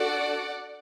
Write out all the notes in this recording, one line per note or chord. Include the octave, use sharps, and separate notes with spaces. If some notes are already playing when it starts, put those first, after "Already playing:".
Already playing: D4 F#4 A4 D5 F#5